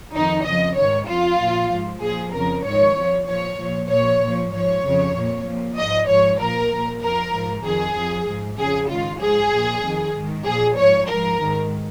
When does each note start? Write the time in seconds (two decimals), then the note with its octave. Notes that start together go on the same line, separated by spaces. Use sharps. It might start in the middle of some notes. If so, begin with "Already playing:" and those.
0.15 F2 D#3 D#4
0.46 F2 C#3 F3 D#5
0.77 G#2 D#3 C#5
1.08 F2 F3 F4
1.40 A#2 F3
1.71 G#2 F3
2.02 A#2 F3 G#4
2.33 F2 C#3 F3 A#4
2.65 G#2 D#3 C#5
2.97 F2 F3
3.27 A#2 F3 C#5
3.59 A#2 F3
3.89 A#2 F3 C#5
4.22 A#2 F3
4.52 G#2 F3 C#5
4.84 F2 C#3 F3
5.15 A#2 F3
5.46 A#2 F3
5.77 G#2 F3 D#5
6.08 G#2 F3 C#5
6.40 A#2 F3 A#4
6.71 A#2 F3
7.02 F2 F3 A#4
7.33 G#2 F3
7.65 F2 D#3 G#4
7.96 F2 F3
8.28 G#2 F3
8.59 F2 C#3 F3 G#4
8.90 G#2 D#3 F4
9.21 G#2 F3 G#4
9.53 A#2 F3
9.84 F2 D#3
10.15 G#2 D#3
10.46 A#2 F3 G#4
10.77 G#2 F3 C#5
11.09 G#2 F3 A#4
11.40 G#2 D#3